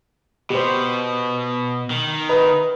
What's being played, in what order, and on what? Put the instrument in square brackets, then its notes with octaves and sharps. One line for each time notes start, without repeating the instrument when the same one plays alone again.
[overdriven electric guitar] B2 [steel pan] G4 C5
[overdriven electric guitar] D#3
[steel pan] B4 D#5 A#5